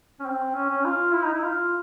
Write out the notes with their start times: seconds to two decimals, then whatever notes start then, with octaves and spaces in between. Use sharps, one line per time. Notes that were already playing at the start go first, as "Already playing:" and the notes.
0.19 C#4
0.26 C4
0.55 C#4
0.69 C#4
0.84 F4
1.13 E4
1.23 D#4
1.33 E4
1.43 F4